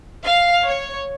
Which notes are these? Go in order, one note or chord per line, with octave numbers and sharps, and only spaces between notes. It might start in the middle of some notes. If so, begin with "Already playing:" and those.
F5
C#5